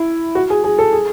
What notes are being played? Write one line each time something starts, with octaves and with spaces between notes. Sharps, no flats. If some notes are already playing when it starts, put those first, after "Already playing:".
Already playing: E4
F#4
G#4
G#4
A4
G#4